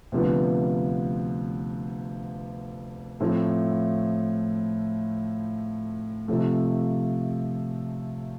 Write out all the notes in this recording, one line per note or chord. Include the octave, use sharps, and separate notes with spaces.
D2 C3 F3 B3 D4
A2 F3 A3 C4 E4
C3 F3 A3